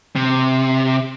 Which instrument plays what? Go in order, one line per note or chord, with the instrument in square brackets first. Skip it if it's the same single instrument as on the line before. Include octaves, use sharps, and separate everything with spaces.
[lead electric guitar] C3